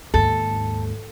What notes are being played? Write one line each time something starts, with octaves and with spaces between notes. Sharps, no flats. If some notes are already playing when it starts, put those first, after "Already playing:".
D#2 G#2 A4